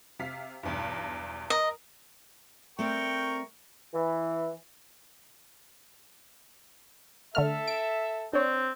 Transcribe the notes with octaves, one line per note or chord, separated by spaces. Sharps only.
C3 F5 B6
B1 E2 G2
A#4 D#5
A3 C4 A#4 D5 G5 C#6
E3
D3 A3 A4 E5 F6
D7
C4 D4 C#5